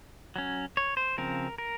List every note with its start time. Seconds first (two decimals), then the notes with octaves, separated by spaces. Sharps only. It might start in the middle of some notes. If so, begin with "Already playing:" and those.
0.36 F#3 C#4
0.77 C#5
0.97 C5
1.18 C#3 F3 C4 A#4
1.58 A#4